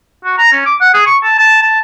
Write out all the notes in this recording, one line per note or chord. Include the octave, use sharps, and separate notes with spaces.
F#4
A#5
C#4
D6
F#5
G#4
C#6
A5
A5
A5